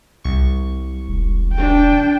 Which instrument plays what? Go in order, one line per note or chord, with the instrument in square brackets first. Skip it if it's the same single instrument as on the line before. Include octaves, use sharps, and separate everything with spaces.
[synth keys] C2 C#6
[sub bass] E1
[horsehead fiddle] D4 G5